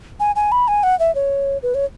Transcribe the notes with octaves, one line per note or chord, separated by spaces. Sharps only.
G#5
G#5
B5
G#5
F#5
E5
C#5
B4
C#5